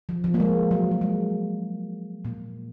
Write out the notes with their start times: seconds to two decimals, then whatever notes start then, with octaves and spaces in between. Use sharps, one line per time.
0.09 F3
0.24 F3
0.34 A#3
0.40 G#3
0.71 F#3
0.91 F#3
1.01 G#3
2.25 A#2 A#3